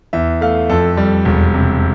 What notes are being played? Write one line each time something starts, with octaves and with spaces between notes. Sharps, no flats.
E2 E5
A3 F5
F2 A4
G3
E1
C3